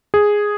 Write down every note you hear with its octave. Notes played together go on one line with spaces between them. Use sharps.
G#4